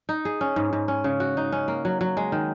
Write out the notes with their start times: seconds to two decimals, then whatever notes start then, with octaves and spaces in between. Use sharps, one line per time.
0.09 D#4
0.25 G#4
0.41 C#4
0.56 G#2
0.73 G#2
0.88 C#4
1.04 C#3
1.20 F#4
1.37 D#4
1.52 C#4
1.68 A#3
1.85 F#3
2.01 F#3
2.17 G#3
2.32 D#3